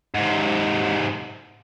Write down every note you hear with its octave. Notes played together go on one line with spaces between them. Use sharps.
G#2 C3